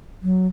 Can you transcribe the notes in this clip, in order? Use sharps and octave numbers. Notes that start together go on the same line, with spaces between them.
F#3